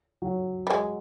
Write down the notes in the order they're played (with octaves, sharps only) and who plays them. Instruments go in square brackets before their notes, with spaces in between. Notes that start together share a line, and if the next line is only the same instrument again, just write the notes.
[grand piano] F#3
[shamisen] G3
G#3